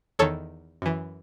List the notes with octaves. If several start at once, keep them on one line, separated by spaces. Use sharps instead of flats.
E2 D#3 A4 C#5
F#2 E3